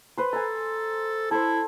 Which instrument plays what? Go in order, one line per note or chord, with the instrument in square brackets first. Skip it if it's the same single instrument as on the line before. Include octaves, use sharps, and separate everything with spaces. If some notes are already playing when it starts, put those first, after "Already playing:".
[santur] B4 C5
[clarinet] A4 [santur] G#5 A#5
[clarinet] E4 [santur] A4 C5